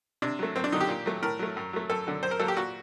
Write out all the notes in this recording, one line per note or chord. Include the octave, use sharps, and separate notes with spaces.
C3 D4
F#3 A3
F#2 C4
D4
D3 F#3 D#4
G4
A#2
F#3 A3
A2 A#4
F#3 A3
F#2
F#3 A3
F#2 A4
D3 F#3
F#2 C5
A#4
F#3 A#3 A4
G4
A#2 F#4